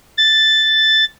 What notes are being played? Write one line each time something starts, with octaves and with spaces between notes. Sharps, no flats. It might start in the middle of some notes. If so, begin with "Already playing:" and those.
A6